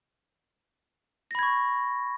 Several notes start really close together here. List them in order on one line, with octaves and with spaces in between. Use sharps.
A#6 B5 G#6 C#6